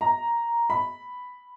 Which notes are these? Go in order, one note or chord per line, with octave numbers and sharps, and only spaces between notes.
A#5
B5